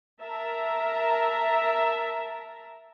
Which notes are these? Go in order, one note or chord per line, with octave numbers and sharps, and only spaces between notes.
A#4 E5 A5 A#5